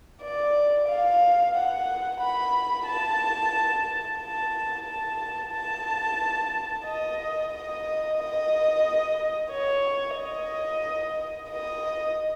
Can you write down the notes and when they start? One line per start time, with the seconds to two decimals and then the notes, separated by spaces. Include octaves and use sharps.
0.22 D5
0.89 F5
1.55 F#5
2.21 B5
2.87 A5
4.20 A5
4.86 A5
5.53 A5
6.86 D#5
7.52 D#5
8.18 D#5
9.51 C#5
10.16 D#5
11.50 D#5